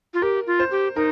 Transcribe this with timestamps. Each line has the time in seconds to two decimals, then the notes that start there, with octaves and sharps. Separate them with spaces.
0.14 F4
0.22 G4 A#4
0.47 F4
0.59 C5
0.71 G4
0.96 D#4 A#4